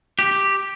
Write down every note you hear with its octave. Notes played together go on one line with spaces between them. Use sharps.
G4